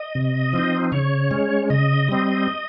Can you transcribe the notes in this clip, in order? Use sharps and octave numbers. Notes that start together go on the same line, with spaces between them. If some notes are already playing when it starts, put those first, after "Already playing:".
Already playing: D#5
C3
F3 C4 D#4
C#3 C#5
G#3 C#4
C#3 D#5
G3 C4